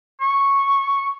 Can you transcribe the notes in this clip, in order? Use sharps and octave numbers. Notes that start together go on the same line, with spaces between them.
C#6